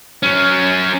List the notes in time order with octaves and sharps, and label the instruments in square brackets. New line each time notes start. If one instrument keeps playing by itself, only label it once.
[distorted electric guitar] F#3 C#4